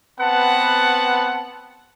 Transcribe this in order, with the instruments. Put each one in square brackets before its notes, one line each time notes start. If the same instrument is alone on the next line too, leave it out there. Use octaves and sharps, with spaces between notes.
[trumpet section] B3 C4 B4 F#5 A5